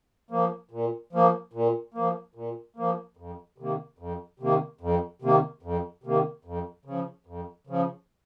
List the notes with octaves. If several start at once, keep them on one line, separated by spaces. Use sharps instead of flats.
F3 A#3
A#2
F3 A#3
A#2
F3 A#3
A#2
F3 A#3
F2
C3 D#3 A#3
F2
C3 D#3 A#3
F2
C3 D#3 A#3
F2
C3 D#3 A#3
F2
C#3 F3
F2
C#3 F3